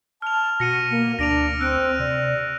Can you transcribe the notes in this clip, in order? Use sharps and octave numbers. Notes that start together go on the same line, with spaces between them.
A5 F6 F7
B2 F#4 A#6 C#7 D#7
A#3
D2 D4 A#6 D7 F7
C4 E6 F#6 D7
C3 D5